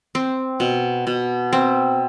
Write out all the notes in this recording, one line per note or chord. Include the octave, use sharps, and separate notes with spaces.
C4
B2
B2
C4